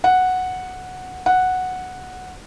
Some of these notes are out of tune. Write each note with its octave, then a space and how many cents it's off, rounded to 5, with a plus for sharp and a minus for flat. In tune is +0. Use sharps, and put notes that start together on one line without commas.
F#5 -5
F#5 -5